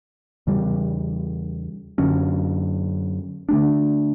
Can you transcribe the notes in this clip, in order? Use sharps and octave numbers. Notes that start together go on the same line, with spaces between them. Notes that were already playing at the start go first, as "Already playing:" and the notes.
E2 C#3 G3
F#2 D3 F#3 C#4
D3 A3 D4